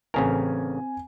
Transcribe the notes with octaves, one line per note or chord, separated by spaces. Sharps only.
A1 C#3 C4 A#4 G#5